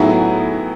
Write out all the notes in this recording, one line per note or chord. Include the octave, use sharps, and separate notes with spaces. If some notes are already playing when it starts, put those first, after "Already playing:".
Already playing: A2 F#3 B3 D#4 E4 G#4